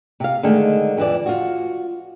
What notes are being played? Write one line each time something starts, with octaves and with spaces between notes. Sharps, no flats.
C3 F5
D3 D#3 G#3 A3
F2 E3 D5
F4 F#4